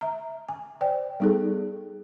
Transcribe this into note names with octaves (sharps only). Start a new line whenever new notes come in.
E5 A#5
G#5
C5 D5 G5
G3 B3 D#4 G#4 A4